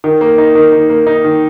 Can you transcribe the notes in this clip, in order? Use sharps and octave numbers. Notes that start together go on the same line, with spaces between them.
D#3
A#3
D#4
D#3
D#3
A#3
D#4
D#3